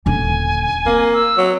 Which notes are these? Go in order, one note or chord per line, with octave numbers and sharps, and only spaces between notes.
D#1 D3 G#5
A#3 C4
E6
F#3